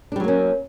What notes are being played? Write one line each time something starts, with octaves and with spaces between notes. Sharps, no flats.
F#3 G3 A#3 C#4 D4